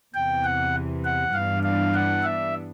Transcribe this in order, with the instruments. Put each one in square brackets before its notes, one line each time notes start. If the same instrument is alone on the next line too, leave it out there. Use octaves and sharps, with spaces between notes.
[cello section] E2 C3 E3 [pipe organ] G5
[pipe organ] F#5
F#5
[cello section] G2 E3 G3 B3 D4 [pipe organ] F5
[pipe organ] F5
F#5
E5